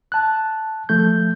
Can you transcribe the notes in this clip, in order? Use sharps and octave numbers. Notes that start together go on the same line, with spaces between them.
A5 F#6
F3 A3 G6